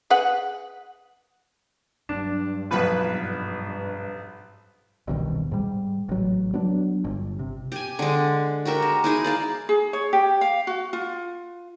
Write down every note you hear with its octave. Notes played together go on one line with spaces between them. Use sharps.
G#4 B4 F#5
G2 F#3 D4
B1 F2 G#2 B4
E1 C2 B2 D#3
G#2 G3
A1 F#3
F#3 B3 D4
G1
C3
G4 G#5
D3 G#3
F#4 G4 A#4 E5
G#3
D#4 E4 G#4
D5 F5 A5
G#4
C#5
G4
F5
F#4
F4